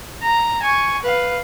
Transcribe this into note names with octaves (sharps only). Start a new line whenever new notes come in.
A#5
G#5 C#6
B4 F5